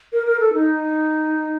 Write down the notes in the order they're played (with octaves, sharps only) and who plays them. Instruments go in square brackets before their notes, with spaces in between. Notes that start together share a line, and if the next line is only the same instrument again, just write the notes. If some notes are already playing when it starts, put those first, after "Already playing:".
[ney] A#4
A#4
A4
D#4